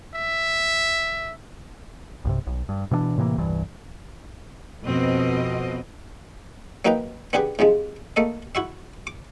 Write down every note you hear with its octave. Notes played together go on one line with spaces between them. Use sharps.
E5
B1 G2 C3
B1
G2
B2 E3 A#3 D4
A2 C3 E3 A#3
E1 C2 G2 E3
F2 B2 B3 C4 D#5
F#3 A#3 D#4 B4 G5 A#5
B3 D4 G4 G#4 B4
G#2 C3 F3 G#3
A3 A#3 A4 D#5
E4 F#4 E5
D6